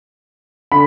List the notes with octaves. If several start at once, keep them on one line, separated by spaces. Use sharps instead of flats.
D3 B5